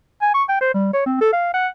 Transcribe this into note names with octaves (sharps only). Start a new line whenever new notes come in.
G#5
C#6
G5
C5
G3
C#5
C4
A4
F5
F#5